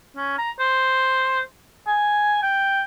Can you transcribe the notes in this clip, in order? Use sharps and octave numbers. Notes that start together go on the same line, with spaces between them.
C#4
A#5
C5
G#5
G5